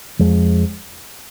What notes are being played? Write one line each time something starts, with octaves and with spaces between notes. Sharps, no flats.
F2 F3 G#3